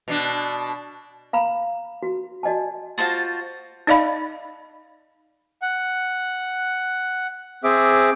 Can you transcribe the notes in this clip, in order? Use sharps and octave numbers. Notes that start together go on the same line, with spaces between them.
B2 D4
F5 A#5 B5
F#4
F#4 D5 D#5 G#5 A5
F4 F#4 C5 A5
D#4 D5 D#5 F5 B5
F#5
C4 G#4 E5 D6